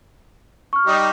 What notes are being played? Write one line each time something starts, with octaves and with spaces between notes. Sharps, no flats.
C#6 F6
G3 D#4 G4